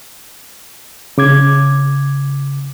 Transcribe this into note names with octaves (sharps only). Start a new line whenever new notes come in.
C#3 D6 G#6